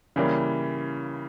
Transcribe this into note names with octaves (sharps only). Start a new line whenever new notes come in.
C#3 E3 G3 A#3 C#4